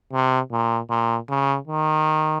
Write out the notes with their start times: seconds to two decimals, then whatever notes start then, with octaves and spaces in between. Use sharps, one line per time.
0.13 C3
0.52 A#2
0.90 A#2
1.29 C#3
1.67 D#3